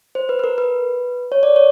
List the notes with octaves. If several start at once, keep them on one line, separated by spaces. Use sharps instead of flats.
C5
B4
B4
A#4
B4
C#5
D5
C#5